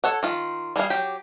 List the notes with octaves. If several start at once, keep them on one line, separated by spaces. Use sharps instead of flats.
A4 C#5 F#5
D#3 F4
G3 G#4 A4 F5
F#3 G4